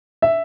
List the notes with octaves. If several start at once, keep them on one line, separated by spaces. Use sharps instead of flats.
E5